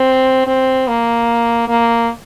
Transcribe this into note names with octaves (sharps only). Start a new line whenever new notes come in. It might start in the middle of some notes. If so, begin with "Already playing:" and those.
Already playing: C4
C4
A#3
A#3